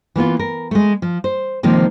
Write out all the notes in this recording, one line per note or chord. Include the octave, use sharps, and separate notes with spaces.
E3 A#3 B3 F4
A#4
G#3 A3
F3
C5
C3 D#3 F3 G#3 A#3 C4